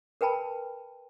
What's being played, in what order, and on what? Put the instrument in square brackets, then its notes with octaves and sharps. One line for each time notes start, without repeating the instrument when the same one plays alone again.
[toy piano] A#4 B4 G5 A5 B5